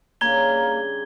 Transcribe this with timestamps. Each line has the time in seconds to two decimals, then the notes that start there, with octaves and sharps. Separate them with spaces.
0.21 G2 C#3 A#3 A#5 G#6 G7